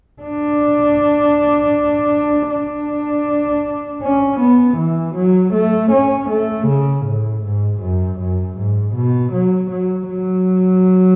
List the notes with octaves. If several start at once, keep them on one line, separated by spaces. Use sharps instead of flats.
D4
D4
C#4
B3
E3
F#3
A3
C#4
A3
C#3
A2
G#2
F#2
F#2
G#2
B2
F#3
F#3
F#3